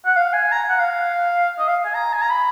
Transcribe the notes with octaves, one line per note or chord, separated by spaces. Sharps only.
F#5
F5
G#5
A#5
F#5
F5
D#5
F5
G#5
A#5
G#5
A#5
B5